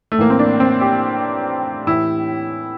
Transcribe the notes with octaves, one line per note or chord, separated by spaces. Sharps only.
A3
A2 E3 A#3
C4
D4
C4
G4
A2 E3 E4